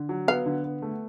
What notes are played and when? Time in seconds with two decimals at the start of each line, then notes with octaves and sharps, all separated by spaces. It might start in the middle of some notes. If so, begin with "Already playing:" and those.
Already playing: D3
0.09 F#3
0.28 B3 F5
0.46 D3
0.64 B3
0.82 A3